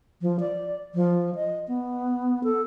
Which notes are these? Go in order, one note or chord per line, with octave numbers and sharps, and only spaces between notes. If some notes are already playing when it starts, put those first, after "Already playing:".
F3
D5
F3
D#5
B3
A4